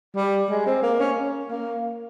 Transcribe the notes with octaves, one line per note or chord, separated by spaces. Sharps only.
G3
G#3
C4
A#3
C#4
A#3